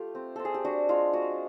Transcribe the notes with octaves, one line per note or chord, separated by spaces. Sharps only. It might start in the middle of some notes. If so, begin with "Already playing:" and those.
Already playing: A3 F4 G4
C4
C4 A4
G#4
G4
D4 F#4
G#3 F4
F4 F#4